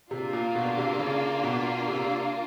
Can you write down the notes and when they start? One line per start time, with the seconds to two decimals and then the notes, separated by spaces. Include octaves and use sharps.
0.11 C3 A#3 D4 F4
0.33 A#2
0.55 B2
0.77 C3
0.99 C#3
1.44 B2
1.88 C3